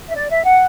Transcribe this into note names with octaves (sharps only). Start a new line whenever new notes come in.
E5
D5
E5
F#5